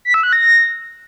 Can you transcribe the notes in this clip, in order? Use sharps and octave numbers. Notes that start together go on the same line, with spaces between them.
B6
E6
F#6
A#6